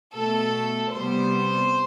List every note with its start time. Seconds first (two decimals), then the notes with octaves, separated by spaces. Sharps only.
0.14 B2 A3 A4
0.92 C3 G3 B3 C5